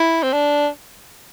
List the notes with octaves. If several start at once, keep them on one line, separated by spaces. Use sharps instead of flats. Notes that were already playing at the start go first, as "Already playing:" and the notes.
Already playing: E4
C4
D4